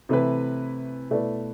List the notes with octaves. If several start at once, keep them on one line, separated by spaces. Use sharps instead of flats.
C3 E3 A3 E4 B4
B2 A3 E4 B4 D5